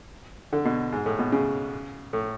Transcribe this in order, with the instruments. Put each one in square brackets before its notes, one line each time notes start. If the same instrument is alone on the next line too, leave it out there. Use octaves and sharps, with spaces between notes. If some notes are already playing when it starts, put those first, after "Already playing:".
[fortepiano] D3
B2
G#2
A2
B2
C#3
A2